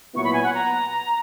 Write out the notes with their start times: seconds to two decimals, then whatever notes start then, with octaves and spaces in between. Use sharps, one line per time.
0.14 A#2 F#3 B3 E4 C#6
0.24 B5
0.33 G#5
0.44 F#5
0.54 A#5